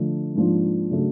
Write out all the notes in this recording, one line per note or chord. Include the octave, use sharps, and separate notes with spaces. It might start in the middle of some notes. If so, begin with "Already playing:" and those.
Already playing: D3 F3 A3
G#2 F3 A#3 D4 F4
C#3 F#3 A3 D4 F#4